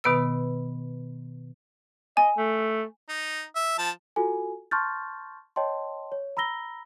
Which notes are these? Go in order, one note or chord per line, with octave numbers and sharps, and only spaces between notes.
B2 D#3 B3 B4 E6
D#5 G#5
A3
D#4
E5
F3 A5
F4 F#4 A4 G#5
A5 C6 C#6 F6 G6 A6
C#5 D#5 G5 A5 C6
C#5
A#5 B5 E6 A#6 G7